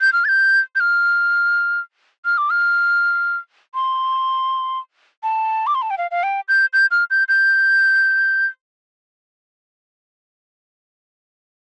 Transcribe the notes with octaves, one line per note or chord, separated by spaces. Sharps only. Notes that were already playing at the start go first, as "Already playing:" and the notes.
G6
F6
A6
G6
G6
F6
F6
D6
F6
C6
A5
D6
C6
A5
G5
F5
F5
G5
G6
G6
F6
G6
G6